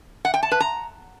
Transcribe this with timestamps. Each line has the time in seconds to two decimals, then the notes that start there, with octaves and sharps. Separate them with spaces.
0.25 F#5
0.34 G5
0.43 A5
0.52 B4
0.60 A#5